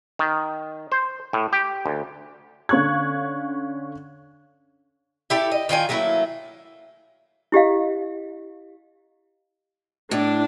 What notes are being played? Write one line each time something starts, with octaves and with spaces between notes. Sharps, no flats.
D#3
C5
A2
G4
D2
D3 C#4 F5 C#6 F#6 G#6
E4 G4 A4
D#5
D#3 F4 G5 G#5
F#3 A3 A#3 E4
E4 G4 D#5 F5
A2 D4